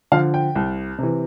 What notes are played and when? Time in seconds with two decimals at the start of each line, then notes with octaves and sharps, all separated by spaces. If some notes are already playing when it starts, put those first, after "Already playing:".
0.12 D3 F3 F5
0.34 G5
0.55 C2
0.98 C3 E3